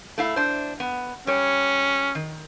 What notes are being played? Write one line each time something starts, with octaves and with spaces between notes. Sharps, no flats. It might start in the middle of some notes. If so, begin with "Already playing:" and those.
A3 E4 F5
D4 C5
B3
G3 C#4 C#5
D#3